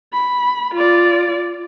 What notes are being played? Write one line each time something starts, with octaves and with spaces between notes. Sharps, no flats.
B5
F4 D5